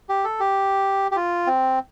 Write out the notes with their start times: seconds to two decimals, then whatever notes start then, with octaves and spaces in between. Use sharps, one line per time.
0.09 G4
0.24 A4
0.40 G4
1.11 G4
1.16 F4
1.47 C4